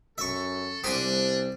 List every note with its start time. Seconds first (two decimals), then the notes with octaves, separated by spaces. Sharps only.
0.18 F#2 A4 E5 C#6
0.84 C2 G3 B3 C4 D4 G4 G#5